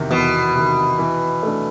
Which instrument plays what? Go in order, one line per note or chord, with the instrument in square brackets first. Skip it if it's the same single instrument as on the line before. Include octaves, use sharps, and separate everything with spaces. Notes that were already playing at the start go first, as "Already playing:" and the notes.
Already playing: [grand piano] E2 C3 D#3
[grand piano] E2 [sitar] B2
[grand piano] C3 D#3
E3
A3 D4